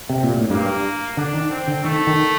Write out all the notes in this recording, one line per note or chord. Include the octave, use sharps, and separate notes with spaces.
C3
A#2
A2
G2 A#3
D3 D4
D#3
C4
D3
D#3 A3
D#3